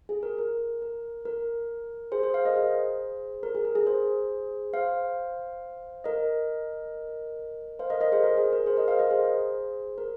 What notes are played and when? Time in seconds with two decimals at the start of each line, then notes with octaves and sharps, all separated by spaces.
0.09 G#4
0.23 A#4
0.38 A#4
0.82 A#4
1.25 A#4
2.12 G#4 C5
2.23 G#4 C5
2.34 C5 F5
2.45 A#4 D#5
2.56 G#4 C5
3.43 A#4
3.55 G#4
3.65 A#4
3.75 G#4
3.86 G#4 C5
4.74 C5 F5
6.04 A#4 D#5
7.79 C5 F5
7.90 A#4 D#5
8.01 A#4 D#5
8.12 G#4 C5
8.24 A#4
8.37 G#4
8.53 A#4
8.66 G#4 C5
8.77 A#4 D#5
8.88 C5 F5
8.99 A#4 D#5
9.10 G#4 C5
9.98 A#4